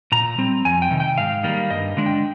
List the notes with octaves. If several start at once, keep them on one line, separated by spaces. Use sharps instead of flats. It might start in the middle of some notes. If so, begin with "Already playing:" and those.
A#2 A#5
G3 C4
F2 G#5
G5
C3 D#3
G5
G#2 F5
D#3 G3 A#3
G2 D#5
D3 G#3 D4
G5